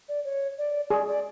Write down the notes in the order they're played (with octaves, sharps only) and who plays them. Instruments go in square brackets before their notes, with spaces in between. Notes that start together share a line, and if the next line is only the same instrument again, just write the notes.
[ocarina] D5
C#5
D5
[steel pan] G#4 [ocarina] D5
[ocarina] D5